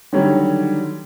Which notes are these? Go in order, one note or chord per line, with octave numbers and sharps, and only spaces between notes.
D3 D#3 F#3 G3 A3 C#5